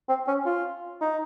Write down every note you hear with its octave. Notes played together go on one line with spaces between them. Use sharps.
C4
C#4
F4
D#4